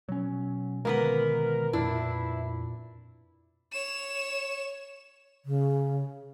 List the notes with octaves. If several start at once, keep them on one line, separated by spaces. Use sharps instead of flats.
B2 F#3 C#4
D3 D#3 G#3 A#3 B3 A#4 B4
F2 A#2 D4 E4
C#5 E7
C#3